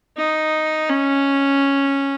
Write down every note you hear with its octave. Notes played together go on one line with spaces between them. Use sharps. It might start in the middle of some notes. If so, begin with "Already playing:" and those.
D#4
C#4